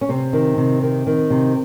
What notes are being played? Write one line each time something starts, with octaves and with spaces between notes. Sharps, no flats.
C#4
C3 C4
D#3
C3
D#3
D#3
C3